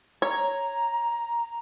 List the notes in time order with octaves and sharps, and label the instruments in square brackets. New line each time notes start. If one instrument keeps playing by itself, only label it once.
[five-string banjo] C#5 [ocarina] A#5